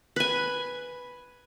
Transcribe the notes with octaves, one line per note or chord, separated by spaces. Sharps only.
B4 G#5